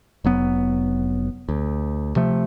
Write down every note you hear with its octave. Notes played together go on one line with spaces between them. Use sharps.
F1 F#3 B3
D2
C3 F3 A3